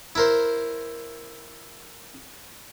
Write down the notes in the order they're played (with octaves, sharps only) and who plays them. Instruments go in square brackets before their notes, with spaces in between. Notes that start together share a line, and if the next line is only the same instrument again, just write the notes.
[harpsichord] E4 A#4 C5